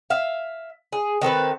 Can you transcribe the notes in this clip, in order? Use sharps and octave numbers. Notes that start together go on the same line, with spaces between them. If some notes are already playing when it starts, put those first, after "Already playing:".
E5 F5
G#4
D#3 C4 A4 B4